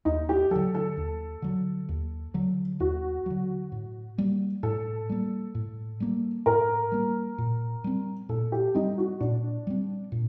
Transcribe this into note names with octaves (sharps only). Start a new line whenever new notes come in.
D#2 D#4
G4
D3 F#3 A4
A4
D#2
D3 F#3
D#2
D3 F#3
D#2 F#4
D3 F#3
A2
G3 A#3
A2 A4
G3 A#3
A2
G3 A#3
A2 A#4
G3 A#3
A#2
G3 C4
A#2 A4
G4
G3 C4 D#4
F#4
A#2 D4
G3 C4
A#2